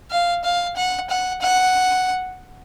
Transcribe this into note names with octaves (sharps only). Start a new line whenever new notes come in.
F5
F5
F#5
F#5
F#5